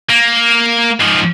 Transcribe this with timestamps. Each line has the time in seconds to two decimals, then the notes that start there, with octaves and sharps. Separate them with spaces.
0.10 A#3
1.00 G#2 F3